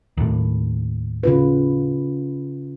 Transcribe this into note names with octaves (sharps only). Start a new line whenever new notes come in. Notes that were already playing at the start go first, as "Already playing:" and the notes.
D#2 A2
C#3 F4 B4